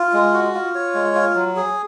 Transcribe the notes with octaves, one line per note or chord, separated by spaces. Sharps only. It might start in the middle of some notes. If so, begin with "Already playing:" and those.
Already playing: F4
G#3
F#4
F4
C#5
G#3
F4
F#3
G#4